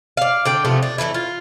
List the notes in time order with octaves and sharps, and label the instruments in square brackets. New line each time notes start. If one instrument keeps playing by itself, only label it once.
[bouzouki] D5 F5
D3 D5 G5
C3 F3 A3 B3
D4
E3 F3 A3 E4
F4